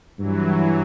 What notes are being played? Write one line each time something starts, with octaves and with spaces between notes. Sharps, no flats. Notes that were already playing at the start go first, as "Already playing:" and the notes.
G2 E3 F#3